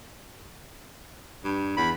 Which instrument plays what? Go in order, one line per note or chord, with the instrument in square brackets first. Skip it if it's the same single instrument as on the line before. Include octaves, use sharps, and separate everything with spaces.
[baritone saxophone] G2
[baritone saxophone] E2 [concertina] B5